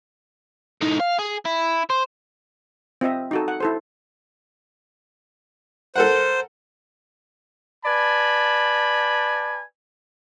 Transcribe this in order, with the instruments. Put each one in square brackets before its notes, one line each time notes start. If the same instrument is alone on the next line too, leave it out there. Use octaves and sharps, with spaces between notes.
[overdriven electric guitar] A2 D#4
F5
G#4
E4
C5
[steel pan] C4 F4 D#5 E5
D#4 F#4 A4
F#5
E4 A4 C5
[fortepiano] A4 A#4 F#5 [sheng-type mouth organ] C5
[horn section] B4 D5 G#5 A5 B5